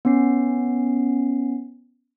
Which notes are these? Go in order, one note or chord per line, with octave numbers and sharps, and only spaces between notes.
B3 C#4 C7